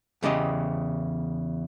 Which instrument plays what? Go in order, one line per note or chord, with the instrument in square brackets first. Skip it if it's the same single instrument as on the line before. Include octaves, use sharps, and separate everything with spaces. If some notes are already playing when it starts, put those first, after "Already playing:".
[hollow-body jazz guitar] E2 C#3 G4 D#5